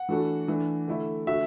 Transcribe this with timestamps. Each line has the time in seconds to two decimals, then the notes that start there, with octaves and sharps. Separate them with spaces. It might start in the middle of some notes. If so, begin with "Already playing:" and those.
Already playing: F#5
0.09 E3 A3 D4 F#4 A4
0.48 E3 A3 D4
0.87 D3 A3 E4
1.27 D3 A3 F#4 E5